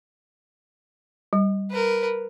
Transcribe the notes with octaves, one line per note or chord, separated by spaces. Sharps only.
G3
A#4 B4